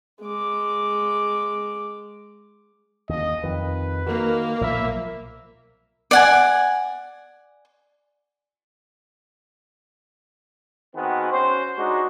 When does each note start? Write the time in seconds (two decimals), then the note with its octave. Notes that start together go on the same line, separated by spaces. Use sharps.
0.22 G#3 D6
3.09 D#2 D#5
3.44 F2 D#3 B4
4.06 D#3 A#3 F#4 A#4
4.61 B1 A#2 F3 E5 B5
6.11 D5 F#5 G#5
10.95 D#3 B3 C4 F#4 G#4
11.32 C#4 F#4 C5
11.76 G#3 D4 D#4 F#4